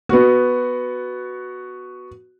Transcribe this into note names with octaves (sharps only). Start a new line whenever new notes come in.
B3 F#4